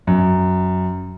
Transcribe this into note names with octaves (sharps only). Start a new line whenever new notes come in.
F#2